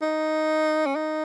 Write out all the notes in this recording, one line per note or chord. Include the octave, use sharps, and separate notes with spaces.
D#4
C#4
D#4